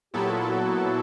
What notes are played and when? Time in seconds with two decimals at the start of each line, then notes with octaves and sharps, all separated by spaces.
0.14 A#2 F#3 B3 E4 G4 A4
0.31 F4
0.49 F#4